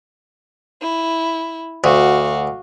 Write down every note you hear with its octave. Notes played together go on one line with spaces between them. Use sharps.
E4
D2 F#4 F5